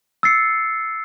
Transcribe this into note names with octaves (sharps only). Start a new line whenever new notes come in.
E6 A6 C7 C#7